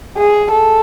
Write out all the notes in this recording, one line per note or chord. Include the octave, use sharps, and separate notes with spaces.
G#4
A4